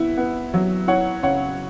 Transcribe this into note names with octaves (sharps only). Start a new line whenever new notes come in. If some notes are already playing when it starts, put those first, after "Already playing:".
Already playing: B3 E4 E5
B3
F#3
E4 C#5 F#5
C#3 C#5 F#5